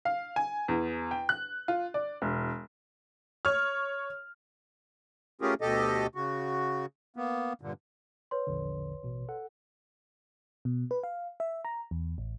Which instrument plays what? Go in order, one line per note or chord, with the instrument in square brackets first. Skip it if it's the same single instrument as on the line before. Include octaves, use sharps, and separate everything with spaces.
[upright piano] F5
G#5
E2
G5
F#6
F4
D5
E1
[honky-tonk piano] C#5 F6
[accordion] A3 C#4 F4 G4 G#4 A#4
D2 B2 G4 A4 D#5
C#3 F#4
A#3 B3
G2 A#2 D3
[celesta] B4 C#5 C6
[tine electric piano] A#1 E2 D3
A1 B2
A4 F#5
[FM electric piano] B2
B4
F5
E5
A#5
E2
A1